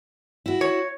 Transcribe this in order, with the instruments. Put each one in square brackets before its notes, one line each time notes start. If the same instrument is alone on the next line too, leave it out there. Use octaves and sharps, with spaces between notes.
[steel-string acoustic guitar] E4 F#4
[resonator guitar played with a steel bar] C#5